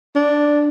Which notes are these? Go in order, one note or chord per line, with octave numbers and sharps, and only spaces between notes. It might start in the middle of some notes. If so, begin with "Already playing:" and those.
D4